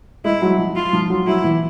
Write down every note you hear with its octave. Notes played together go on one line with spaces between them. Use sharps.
G#3 E4
F#3
F3
F4
F3
F#3
F#3 E4
E3